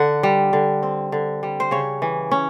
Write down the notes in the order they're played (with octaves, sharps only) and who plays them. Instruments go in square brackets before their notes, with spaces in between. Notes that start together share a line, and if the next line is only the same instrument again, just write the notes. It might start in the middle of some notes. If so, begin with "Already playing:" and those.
Already playing: [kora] D3 F#5
G3
D3
C4
D3
G3
C5
C#3 C#5
E3
C#4